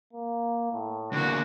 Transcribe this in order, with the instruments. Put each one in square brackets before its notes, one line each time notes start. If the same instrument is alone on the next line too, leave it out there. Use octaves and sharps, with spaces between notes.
[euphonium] A#3
A2
[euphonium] E2 [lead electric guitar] D3 A#3 [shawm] F#4